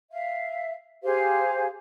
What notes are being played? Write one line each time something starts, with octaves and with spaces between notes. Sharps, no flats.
E5 F5
G4 G#4 C5 F5